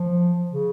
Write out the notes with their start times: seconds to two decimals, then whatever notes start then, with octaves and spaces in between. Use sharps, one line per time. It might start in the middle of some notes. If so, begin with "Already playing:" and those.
Already playing: F3
0.52 C#3